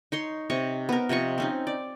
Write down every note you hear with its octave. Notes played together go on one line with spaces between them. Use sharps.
D#4 C#5 C6
C3 C#5 D#5 C#6
B3 A#4
C3 F3 D#5 C#6
C4 C#4 D#4
D5